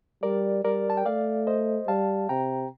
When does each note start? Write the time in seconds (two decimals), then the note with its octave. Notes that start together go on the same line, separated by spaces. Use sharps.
0.23 G3 A#4 D5
0.64 G3 A#4 D5
0.90 A5
0.97 G5
1.06 A3 D5 F5
1.47 C5 D#5
1.88 G3 F5 A5
2.29 C3 G5 A#5